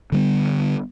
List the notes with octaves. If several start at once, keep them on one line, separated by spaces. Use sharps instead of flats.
D3 G3 B3